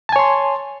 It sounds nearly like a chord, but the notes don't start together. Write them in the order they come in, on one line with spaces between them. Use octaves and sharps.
A5 G#5 C#5 C6